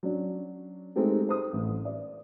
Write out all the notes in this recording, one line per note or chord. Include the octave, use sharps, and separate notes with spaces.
F#3 C#4 D4
G#3 A3 C4 D#4 G4 A4
C5 D#6
A1
D5